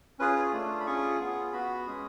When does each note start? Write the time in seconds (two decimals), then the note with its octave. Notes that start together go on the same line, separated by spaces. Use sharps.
0.19 C#4 F4 G#4 B4
0.36 C#5
0.53 A3 D4 F4
0.80 B5
0.86 C#4 F4 G#4 C#6
1.20 B3 F4 G#4
1.53 B3 F#4 B5
1.87 G#3 C#4 G#4